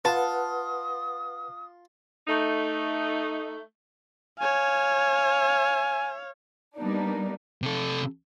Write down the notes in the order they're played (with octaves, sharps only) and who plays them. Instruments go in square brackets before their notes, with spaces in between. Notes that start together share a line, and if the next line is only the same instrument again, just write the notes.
[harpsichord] F4 [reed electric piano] B4 F#5 [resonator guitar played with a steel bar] A5 [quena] D#6
[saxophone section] A3 D#4
[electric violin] C#5 F5 [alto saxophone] G#5
[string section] G3 A#3 B3 D4 D#4
[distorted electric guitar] C3 A4